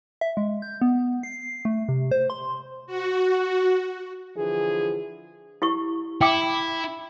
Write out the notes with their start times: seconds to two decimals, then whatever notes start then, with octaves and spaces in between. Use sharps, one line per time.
0.21 E5
0.37 G#3
0.62 G6
0.82 B3
1.23 C7
1.65 A3
1.89 C3
2.11 C5
2.30 C6
2.86 F#4
4.36 D3 E3 F3 G#4
5.62 E4 G4 C#6
6.21 E4 G5 D6